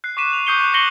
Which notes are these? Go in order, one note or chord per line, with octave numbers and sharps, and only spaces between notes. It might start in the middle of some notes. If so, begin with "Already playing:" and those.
F#6 C7
C#6 D6 B6 D#7 E7
F7
C#6 D#6 G6 C7 C#7 G7
C#6 F#6
D6 A#6 C7 C#7 F#7 G7